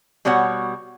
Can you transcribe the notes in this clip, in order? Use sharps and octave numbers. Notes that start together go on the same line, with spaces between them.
B2 G3 B3 F#4 C#5 F#5